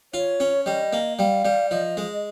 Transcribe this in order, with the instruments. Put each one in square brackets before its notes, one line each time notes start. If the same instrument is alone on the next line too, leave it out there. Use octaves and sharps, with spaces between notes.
[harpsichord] F4 [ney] C#5
[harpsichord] C#4
[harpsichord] G3 [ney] D#5
[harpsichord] A#3
[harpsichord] G3 [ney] F5
[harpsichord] G3
[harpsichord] F3 [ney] D#5
[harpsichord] G#3